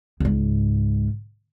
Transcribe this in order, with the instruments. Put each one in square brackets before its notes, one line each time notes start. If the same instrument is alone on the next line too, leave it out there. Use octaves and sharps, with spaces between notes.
[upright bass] C#2 G#2